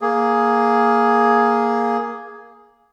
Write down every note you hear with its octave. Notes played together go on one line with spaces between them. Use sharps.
A#3 G#4